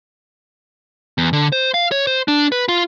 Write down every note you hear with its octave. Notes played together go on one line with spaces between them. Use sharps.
E2
D3
C5
F5
C#5
C5
D4
B4
F4